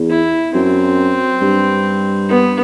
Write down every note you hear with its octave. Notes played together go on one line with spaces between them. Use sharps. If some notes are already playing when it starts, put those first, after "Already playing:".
Already playing: E2
E4
F#2 C4
G2
B3